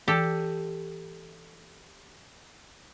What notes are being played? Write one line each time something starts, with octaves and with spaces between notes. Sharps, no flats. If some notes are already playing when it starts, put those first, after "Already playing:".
E3 G4 A4